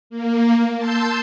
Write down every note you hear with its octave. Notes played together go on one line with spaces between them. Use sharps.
A#3
A5 C6 E6 G6